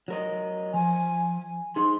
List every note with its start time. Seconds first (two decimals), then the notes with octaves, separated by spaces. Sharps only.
0.08 F#3 A#4 D#5
0.74 F3 G#5
1.76 D#4 G#4 C6